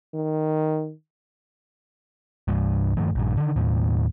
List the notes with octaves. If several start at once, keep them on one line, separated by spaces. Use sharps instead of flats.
D#3
C2 G2
G2 D#3 F3 A3
A#1 G2
D3 D#3
D#2 A2